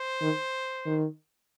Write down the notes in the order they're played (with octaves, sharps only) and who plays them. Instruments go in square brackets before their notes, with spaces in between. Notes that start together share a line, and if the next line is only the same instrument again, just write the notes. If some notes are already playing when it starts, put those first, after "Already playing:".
Already playing: [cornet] C5
[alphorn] D#3
D#3